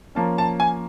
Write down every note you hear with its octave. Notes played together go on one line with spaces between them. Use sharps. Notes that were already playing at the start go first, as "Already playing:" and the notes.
F3 A#3 C#4 A5
A5
G#5